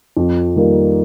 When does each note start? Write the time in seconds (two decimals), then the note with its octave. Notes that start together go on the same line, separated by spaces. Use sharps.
0.17 F2
0.56 D#3 G3 A#3